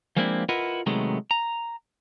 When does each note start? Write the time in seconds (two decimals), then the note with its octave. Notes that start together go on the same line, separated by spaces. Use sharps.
0.16 F3 G#3 A#3 C4 D4 E4
0.49 E4 F4 A#4 B4 D#5 F#5
0.86 C3 D#3 F#3 G#3 A3 B3
1.31 A#5